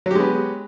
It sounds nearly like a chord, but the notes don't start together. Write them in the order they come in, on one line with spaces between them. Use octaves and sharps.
F#3 G4 G#3 B3